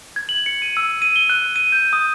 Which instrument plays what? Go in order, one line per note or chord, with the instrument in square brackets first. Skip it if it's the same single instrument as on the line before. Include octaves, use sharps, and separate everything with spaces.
[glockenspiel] G#6
F#7
C#7
D#7
E6
D#7
G7
F#6
D#7
G6
D#6